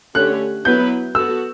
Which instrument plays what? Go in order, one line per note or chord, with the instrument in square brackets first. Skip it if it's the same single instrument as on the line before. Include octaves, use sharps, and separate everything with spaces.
[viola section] D3 A3 C#4 G4 C#5 [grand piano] F#6
[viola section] F#3 B3 E4 B4 [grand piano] G6
[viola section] B3 F#4 A4 [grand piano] E6